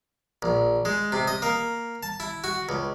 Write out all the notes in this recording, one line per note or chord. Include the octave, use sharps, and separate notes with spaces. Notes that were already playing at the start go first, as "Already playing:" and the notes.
A#1
G#3
C3
D#5
A#3
A5
E4
F#4
C#2